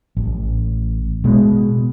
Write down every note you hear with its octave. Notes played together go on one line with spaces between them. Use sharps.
A1
B2 G#3